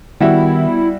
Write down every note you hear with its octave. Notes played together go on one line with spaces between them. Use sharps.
D#3 G3 B3 E4 F#4 E5